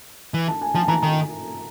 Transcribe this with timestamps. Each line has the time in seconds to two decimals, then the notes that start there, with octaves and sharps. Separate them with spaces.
0.34 E3
0.48 A5
0.61 G#5
0.75 F3 A5
0.88 E3 A#5
1.02 D#3 A#5